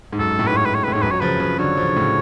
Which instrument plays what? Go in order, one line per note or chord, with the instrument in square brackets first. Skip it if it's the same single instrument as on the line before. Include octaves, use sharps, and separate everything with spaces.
[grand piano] G#2
[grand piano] F#2 [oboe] A4
[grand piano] A2
[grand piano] G#2 [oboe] B4
[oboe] C#5
B4
C#5
[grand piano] A2 [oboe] B4
[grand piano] G#2 [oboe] C#5
[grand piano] F#2 [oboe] B4
[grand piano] F#3 [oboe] C#5
[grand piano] C#3 F3 [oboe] B4
[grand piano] C#3 F3
[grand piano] D3 F#3 [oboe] C#5
[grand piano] C#3 F3
D3
A2 C#3